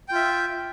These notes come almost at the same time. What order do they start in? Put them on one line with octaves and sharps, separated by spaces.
G5 F4 E5